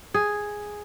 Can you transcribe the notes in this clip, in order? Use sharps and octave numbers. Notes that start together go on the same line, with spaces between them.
G#4